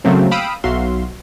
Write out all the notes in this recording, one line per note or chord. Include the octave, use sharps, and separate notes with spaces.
C#3 F#3 A3 A#3 C4 C#4
F5 G5 B5 D#6 E6 D7
B1 F#3 F#4 E5 F5 C6